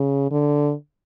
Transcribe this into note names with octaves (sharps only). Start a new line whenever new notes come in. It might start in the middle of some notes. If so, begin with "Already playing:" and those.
Already playing: C#3
D3